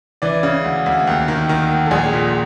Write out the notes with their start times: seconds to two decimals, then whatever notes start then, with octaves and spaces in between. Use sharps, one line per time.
0.22 E3 D5
0.43 C#3
0.64 D2
0.86 D2
1.07 D#2
1.28 D#3
1.49 D#3
1.70 D#2
1.86 A4
1.91 A#1 G#4
2.13 A#2